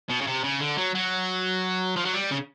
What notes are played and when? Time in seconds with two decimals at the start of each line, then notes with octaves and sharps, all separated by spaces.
0.09 B2
0.21 C#3
0.27 C3
0.44 C#3
0.60 D3
0.78 F#3
0.95 F#3
1.96 F3
2.05 F#3
2.14 G3
2.31 C#3